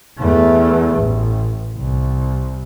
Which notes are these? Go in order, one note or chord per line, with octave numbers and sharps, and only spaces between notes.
E2 A3
A1
C2